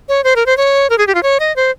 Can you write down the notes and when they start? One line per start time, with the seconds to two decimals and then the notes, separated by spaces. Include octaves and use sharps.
0.09 C#5
0.24 C5
0.36 A#4
0.46 C5
0.57 C#5
0.90 A#4
0.98 G#4
1.07 G4
1.15 F4
1.23 C#5
1.40 D#5
1.56 C5